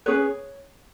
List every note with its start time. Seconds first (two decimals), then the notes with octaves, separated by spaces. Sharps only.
0.06 C#4 G#4 B4 C#5